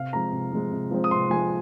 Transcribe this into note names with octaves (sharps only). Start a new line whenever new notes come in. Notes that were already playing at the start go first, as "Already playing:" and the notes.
Already playing: C3 F5
F3 G#3 C4 A#5
C3
F3 G#3 C4
C3
F3 G#3 C4
D#6
C3 C6
F3 G#3 C4 G#5